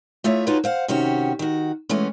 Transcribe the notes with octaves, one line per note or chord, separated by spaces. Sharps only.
A3 E4 F4 G#4 C#5 E5
D#4 F4 F#4 A4 B4 C#5
C5 F5 F#5
C3 D#3 C#4 F#4 G4
D#3 F#4
E3 G#3 A3 B3 C#4